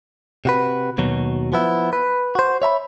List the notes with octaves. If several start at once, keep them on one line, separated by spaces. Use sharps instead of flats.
C3 F#4 B4
D#2 B2 F#3
F3 B3 E4
B4
F#4 C5
C#5 E5 A#5 B5